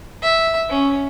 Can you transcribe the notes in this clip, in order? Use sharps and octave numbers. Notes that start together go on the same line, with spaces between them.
E5
C#4